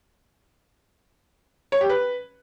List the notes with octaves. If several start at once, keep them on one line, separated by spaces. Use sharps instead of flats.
C#5
G4
B4